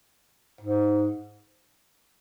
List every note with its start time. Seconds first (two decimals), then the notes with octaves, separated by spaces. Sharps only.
0.61 G#2